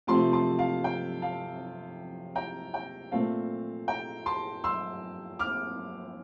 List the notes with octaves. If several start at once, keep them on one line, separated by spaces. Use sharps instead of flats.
C3 F3 A3 C4 A5 C6
A5 C6
F5 A5
G5
F5 A5
G5 A#5
G5
A#2 A3 C4 F5 A5
G5 A#5
A5 C6
C6 E6
D6 F6